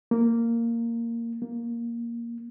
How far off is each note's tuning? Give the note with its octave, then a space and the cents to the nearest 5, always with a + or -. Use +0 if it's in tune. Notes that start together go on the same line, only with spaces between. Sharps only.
A#3 -10
A#3 +5